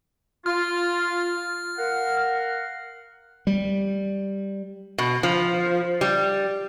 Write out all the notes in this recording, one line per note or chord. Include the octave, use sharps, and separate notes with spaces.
F4 F6
A#4 F5 F#5
G3
B2
F3
G3